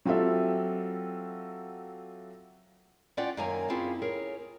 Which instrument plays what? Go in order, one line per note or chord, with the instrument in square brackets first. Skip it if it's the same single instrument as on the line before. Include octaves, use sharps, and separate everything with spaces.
[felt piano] F#3 C4 F4 G4 A4 E5
[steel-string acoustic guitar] C#4 F4 D5 F#5 G5
F#2 D#3 A#3 C#5 G#5 A#5
A#3 C4 C#4 E4 F4 G#4
G#4 A#4 C#5